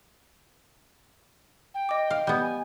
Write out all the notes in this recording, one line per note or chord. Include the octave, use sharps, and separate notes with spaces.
G5
D#5 D6
F5
G3 B3 G6
G#5